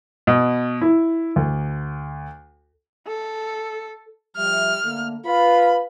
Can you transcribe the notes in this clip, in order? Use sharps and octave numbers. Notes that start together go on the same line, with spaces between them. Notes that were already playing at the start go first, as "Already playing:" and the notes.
B2
E4
D2
A4
F3 G3 E5 F6
D3 A3 A#3
F4 B4 B5